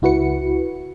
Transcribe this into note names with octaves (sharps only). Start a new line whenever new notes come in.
C#2 E4 F#4 B4 C#7